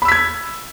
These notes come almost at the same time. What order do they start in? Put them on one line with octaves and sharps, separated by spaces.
B5 E6 B6 G#6